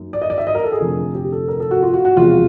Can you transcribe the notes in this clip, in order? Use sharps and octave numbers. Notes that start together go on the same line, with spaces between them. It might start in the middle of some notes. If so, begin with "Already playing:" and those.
Already playing: F#2 D#3 F#3 A#3
D5
D#5
D5
E5
D#5
A#4
A4
G#4
F1 F2 D3 F3
G4
A4
A#4
A4
F#4
F4
F#4
F#4
E1 E2 C3 F3 F4